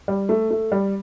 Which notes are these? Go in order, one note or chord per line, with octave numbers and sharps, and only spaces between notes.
G3
A3
A3
G3